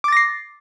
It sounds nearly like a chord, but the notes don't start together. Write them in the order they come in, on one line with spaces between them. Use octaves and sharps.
D6 A6 A#6 C7